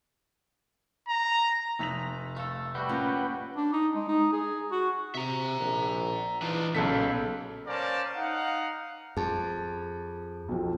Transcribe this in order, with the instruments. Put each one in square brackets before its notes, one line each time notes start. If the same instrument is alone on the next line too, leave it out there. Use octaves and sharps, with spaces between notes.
[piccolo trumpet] A#5
[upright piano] F1 B6 F7 [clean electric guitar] D#4 A4
[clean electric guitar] A3 A4 [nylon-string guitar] F5
[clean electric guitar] G3 A3 F#4 [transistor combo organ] B4 F#5 G5
[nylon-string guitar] A#3 C#4 F4
[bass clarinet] D4
D#4
G#3
D#4
G#4
F#4
[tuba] C3 [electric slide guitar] E5 A#5
[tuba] A#1
[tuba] E3 [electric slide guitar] D4 D#4 F4
[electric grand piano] B1 A4 B6 [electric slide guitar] A#2 [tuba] C#3
[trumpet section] C#4 A#4 C5 D5 F5 A5
D#4 F5 F#5
[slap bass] F2 [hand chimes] G#4 A5
[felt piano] B1 F2